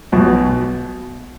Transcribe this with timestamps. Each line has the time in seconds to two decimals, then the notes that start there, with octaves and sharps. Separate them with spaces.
0.12 B1 B2